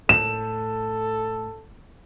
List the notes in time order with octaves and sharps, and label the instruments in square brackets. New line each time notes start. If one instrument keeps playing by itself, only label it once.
[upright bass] A2 [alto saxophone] A4 [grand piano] E7